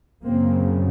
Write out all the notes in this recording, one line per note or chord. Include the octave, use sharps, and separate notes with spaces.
F#2 C#3 A#3 C4